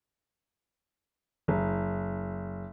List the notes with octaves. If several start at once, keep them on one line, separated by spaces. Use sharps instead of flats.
F#1